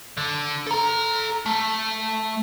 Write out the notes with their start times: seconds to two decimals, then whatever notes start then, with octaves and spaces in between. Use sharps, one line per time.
0.17 D3
0.67 A4 A#5
1.46 A3